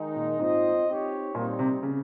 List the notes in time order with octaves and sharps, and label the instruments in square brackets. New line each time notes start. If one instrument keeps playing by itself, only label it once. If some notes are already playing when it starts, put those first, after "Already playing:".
Already playing: [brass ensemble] D#3 G#3 D#4
[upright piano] A#2
[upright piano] G#2 [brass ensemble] C4 F4 C5 D#5
[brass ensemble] C4 D#4 G4 C#5
[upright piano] A#2 [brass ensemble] G3 C4 D#4
[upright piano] C3
C#3